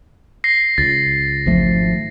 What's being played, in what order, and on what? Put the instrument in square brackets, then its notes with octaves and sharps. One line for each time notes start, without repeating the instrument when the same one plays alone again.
[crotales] A#6 C7
[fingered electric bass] C#2 [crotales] A6
[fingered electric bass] G#1 F3 A3